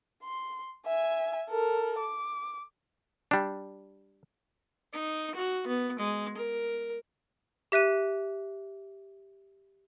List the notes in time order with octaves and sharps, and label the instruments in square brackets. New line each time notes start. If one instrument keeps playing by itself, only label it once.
[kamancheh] C6
E5 G#5
A4 A#4
D6
[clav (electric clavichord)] G3 D4
[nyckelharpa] D#4
F#4
B3
G#3
A#4
[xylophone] G4 E5 F#6 D#7